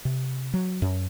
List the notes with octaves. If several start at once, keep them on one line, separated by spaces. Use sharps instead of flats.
C3
F#3
F#2